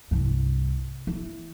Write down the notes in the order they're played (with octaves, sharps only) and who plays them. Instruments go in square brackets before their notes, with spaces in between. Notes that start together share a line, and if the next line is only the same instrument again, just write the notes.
[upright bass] C2 G2
E3